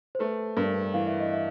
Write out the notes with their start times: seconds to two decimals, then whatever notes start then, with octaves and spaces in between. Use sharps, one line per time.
0.15 C5
0.19 A3 B4
0.57 G2 A#4
0.94 E3 F5
1.07 E5
1.20 D#5
1.33 E5